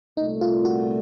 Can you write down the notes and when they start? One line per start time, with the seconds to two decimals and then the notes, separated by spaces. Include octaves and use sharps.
0.17 C2 A#2 A3 D#4
0.41 F4
0.65 F#4